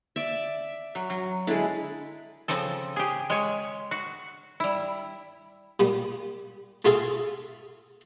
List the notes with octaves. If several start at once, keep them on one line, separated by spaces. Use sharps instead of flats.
D5 E5
F#3
F#3
D3 G#3 E4 B5
C#3 F3 C4 A4
G4 G#4
G#3 C#5
F#4
G3 E4
A#2 G3
A3 F4 G#4 A4